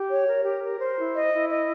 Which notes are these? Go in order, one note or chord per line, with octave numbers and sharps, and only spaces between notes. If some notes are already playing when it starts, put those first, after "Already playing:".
Already playing: G4
C#5
A#4
G4
A#4
C5
E4
D#5
E4
D#5